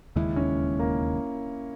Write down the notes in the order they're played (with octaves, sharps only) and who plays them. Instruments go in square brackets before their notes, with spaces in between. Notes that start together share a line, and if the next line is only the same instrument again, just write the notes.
[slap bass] E1 D#2 C#3 G#3 [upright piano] E4
[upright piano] C#4
A#3